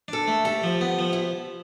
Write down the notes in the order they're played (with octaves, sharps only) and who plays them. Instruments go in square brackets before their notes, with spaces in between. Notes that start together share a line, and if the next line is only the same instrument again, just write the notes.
[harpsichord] D4 [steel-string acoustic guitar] A4
[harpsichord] A3
[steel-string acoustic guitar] G4 [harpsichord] A4
[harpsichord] F3
B3
F3
[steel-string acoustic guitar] E4